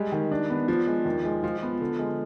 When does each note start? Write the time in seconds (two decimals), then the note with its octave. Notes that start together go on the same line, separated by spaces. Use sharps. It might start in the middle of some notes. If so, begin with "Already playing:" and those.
Already playing: G3 G#3
0.12 D#3
0.31 D4
0.50 B3
0.68 F3 D4
0.87 G#3
1.05 D#2
1.25 G#3
1.43 F3 F4
1.63 B3
1.81 D3
1.99 G#3